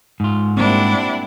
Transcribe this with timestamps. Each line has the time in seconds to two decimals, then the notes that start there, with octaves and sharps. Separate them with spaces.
0.20 G#2 F4
0.57 G3 A#3 C4 D4 E4 F#5